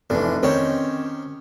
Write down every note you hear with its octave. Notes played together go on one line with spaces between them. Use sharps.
F1 E3 D4
D#3 C4 C#4 G4 C#5